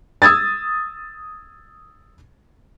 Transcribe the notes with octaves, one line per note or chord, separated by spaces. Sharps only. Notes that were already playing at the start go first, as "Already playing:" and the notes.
D#6 E6 G#6 A6